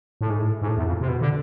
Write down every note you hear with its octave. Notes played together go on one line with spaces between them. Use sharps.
A2
G#2
A2
G#2
A2
E2
F2
C3
B2
D3